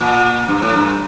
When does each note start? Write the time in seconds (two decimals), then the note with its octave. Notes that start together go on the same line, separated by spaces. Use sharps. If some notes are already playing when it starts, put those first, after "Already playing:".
0.01 A#2
0.48 G2
0.62 A2
0.76 G2